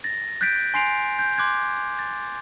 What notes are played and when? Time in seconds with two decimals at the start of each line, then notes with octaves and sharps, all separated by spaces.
0.04 A6 A#6
0.41 F#6 G6 A6 B6 D7
0.74 G#5 C6 C7 D7 F7
1.19 G6
1.38 C6 D6 F#6 G#6
1.99 A6